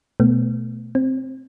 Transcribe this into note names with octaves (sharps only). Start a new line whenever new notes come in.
B2 A3 B3
C4